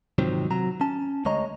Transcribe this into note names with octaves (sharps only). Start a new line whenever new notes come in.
G#2 C3 D#3 F3 F#3 C4
C3 F#3 F#4 A#5
C#4 A5
D2 G#3 C#5 D#5 A#5